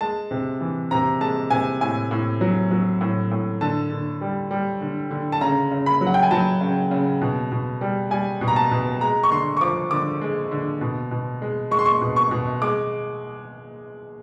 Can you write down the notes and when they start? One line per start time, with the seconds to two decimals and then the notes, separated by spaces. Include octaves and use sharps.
0.01 G#3 A5
0.31 C3
0.61 E3
0.91 C3 A#5
1.21 G#3 A5
1.50 C3 G#5
1.81 A2 G#5
2.11 A2
2.41 F#3
2.71 F#3
3.01 A2
3.31 A2
3.61 D3 A5
3.91 D3
4.21 G3
4.51 G3
4.81 D3
5.11 D3
5.32 A5
5.41 C#3 A#5
5.71 C#3
5.86 B5
6.01 F#3
6.07 F#5
6.14 G5
6.23 G#5
6.31 F#3 A5
6.61 C#3
6.91 C#3
7.21 B2
7.52 B2
7.81 G3
8.11 G3 G#5
8.41 B2
8.48 A#5
8.56 A5
8.71 B2
9.01 G#3 A#5
9.23 C#6
9.31 D3 C6
9.57 C#6
9.61 F3 D6
9.91 D3 D6
10.21 G#3
10.51 D3
10.81 B2
11.11 B2
11.42 G#3
11.71 G#3 C#6
11.79 C6
11.86 C#6
12.01 B2
12.16 C#6
12.31 B2
12.62 G#3 D6